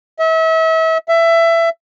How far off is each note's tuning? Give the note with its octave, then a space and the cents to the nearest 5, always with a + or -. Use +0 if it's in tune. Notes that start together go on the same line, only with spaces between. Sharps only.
E5 -35
E5 +20